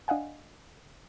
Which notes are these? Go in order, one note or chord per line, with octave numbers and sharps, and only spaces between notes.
D4 D#5 F5 F#5 G#5